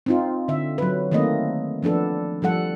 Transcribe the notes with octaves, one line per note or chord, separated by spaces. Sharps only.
C4 D#4 F4
D3 E5
F#3 B4
D#3 A3 A#3 C4 D#5
F3 B3 D4 A4
F3 G3 A4 F#5